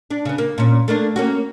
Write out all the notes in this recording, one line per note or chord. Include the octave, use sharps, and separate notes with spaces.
D4
C#3 B3
A#3
A#2 C#4
A3 A#3 D4
A#3 C#4 F#4